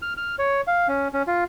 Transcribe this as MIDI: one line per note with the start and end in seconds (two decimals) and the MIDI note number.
0.02 0.13 89
0.17 0.36 89
0.39 0.61 73
0.67 0.88 77
0.88 1.08 61
1.13 1.23 61
1.27 1.44 65